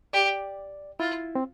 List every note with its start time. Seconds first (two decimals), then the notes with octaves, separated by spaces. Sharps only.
0.13 G4 D5
1.00 E4 F4
1.35 C4